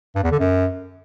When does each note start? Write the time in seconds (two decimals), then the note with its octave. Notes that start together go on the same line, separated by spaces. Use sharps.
0.15 G2
0.23 E2
0.32 D3
0.40 F#2